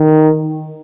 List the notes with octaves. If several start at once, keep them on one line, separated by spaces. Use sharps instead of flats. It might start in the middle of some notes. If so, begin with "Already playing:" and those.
Already playing: D#3